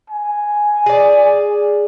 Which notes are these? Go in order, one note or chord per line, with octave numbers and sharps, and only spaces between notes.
G#5
G#4 D5